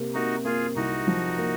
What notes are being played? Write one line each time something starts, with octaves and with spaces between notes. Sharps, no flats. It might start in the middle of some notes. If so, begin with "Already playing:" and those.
Already playing: C3 A#3
A#3 D#4 F#4
A#3 F4 G#4
C2 D#4 F#4
F3
A#3